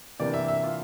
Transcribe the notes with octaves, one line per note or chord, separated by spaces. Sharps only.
C3 E3 A#3 D4 D5
E5
E5
F4